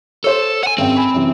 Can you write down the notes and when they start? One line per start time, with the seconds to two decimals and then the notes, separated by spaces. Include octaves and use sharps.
0.24 A4 C5 C#5
0.63 F#5 G#5
0.78 G#1 F#2 C4 G5
0.95 G#5 B5
1.14 F#2 C3 E3